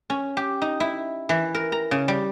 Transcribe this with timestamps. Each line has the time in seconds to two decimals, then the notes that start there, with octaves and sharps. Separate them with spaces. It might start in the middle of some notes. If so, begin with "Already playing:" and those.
0.10 C#4
0.37 G4
0.62 D#4
0.80 E4
1.29 E3
1.54 A#4
1.72 A#5
1.91 C#3
2.08 G3